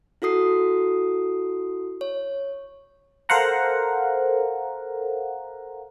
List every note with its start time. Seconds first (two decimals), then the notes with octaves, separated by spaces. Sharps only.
0.22 E4 F#4 A4 D#6 C7
2.01 C#5
3.29 A4 A#4 C5 F5 F#5 A#5